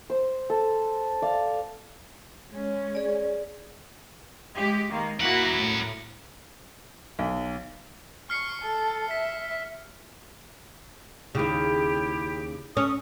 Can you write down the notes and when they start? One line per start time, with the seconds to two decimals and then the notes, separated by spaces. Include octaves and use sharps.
0.10 C5
0.50 A4
1.22 D5 F5
2.52 G#3 C#4
2.95 G#4 D5
4.55 G#3 G4
4.91 D#3 G#3 A#3
5.20 A#3 E4 F#4 A#4 F#5
5.60 A2
7.19 B1
8.30 C#6 F6 C7 C#7
8.62 A4
9.11 E5 B6
11.35 D#2 C#3 E4 G4
12.77 C#4 A4 D#6